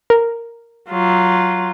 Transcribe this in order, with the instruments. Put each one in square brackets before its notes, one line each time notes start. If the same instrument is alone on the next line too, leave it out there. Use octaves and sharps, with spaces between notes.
[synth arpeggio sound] A#4
[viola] F#3 F4